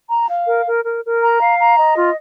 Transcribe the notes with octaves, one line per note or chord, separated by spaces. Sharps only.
A#5
F5
A#4
A#4
A#4
A#4
A#5
F5
A#5
D#5
F4